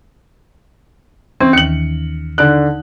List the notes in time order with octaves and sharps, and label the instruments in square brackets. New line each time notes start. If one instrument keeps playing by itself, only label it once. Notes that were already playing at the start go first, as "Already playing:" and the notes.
[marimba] E3 C#4 [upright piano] C4
[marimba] D#2 D#3 [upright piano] C#7 F#7
[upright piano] D3 F#6 [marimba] D#4 D5